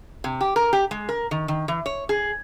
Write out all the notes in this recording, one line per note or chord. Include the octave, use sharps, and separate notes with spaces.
C3
G4
A#4
G4
G#3
A#4
D#3
D#3
E3
C#5
G#4